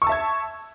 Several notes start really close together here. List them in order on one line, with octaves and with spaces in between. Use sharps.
C#6 E6 A5 E5 G#6